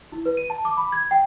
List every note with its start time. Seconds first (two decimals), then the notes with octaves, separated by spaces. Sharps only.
0.12 E4
0.26 B4
0.37 D#7
0.50 A5
0.65 D6
0.77 B5
0.92 G#6
1.11 G5